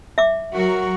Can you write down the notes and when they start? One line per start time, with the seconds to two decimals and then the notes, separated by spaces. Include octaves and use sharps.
0.18 E5 D6
0.53 F#3 F#4 A#4